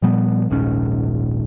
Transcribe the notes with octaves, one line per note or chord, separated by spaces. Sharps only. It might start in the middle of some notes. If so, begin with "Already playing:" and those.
A#2 F3 G3 B3
D#1 A#1 G#2 C#4